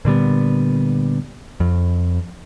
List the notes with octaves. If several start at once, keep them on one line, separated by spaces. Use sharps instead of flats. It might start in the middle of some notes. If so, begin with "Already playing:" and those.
A#2 D3 G3 B3
F2